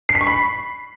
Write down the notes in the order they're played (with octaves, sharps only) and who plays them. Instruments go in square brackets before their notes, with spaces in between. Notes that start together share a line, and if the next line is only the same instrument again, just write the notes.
[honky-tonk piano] C7
B6
C#6
B5